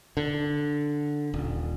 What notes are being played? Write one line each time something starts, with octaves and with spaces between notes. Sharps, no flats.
D3
D#1